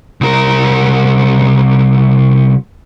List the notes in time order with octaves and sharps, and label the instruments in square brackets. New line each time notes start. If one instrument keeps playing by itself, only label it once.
[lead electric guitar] C2 A#4